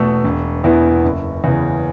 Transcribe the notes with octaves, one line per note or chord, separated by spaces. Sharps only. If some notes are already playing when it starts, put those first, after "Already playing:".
Already playing: E2 B2 A3 C#6 E6
E1
E2 E3 B3 E4
F#1
E2 C#3 E3